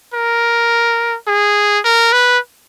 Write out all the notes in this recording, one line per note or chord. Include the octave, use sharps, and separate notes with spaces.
A#4
G#4
A#4
B4